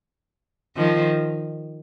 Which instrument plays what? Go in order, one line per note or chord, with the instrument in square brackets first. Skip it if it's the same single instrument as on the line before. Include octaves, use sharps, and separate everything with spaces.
[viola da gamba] D#3 F3